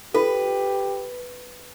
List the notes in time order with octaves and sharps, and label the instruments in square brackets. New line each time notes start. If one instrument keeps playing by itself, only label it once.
[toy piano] F4 A4 [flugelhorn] G4 [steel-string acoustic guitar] B4